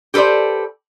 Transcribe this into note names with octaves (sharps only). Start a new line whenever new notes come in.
G4 A4 B4 C5 D5